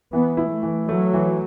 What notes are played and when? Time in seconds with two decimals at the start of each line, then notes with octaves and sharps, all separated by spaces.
0.13 E3 B3
0.37 E4
0.51 A3
0.63 E3
0.89 F#3 A3
1.14 E3